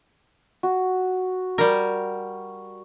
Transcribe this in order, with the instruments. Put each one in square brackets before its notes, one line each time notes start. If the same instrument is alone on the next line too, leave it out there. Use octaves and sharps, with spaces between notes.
[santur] F#4
[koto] G3 A#4